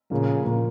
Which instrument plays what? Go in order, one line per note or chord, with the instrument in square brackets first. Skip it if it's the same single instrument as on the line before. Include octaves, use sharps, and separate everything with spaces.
[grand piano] A#2 F3 A#3 [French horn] C#3
[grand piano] A#2 F3 A#3